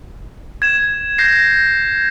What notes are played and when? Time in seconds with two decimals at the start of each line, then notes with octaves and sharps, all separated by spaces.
0.62 G#6 E7
1.18 G6 A#6 C7